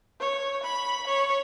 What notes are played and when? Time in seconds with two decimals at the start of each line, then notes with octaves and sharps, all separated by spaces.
0.20 C#5
0.63 B5
1.07 C#5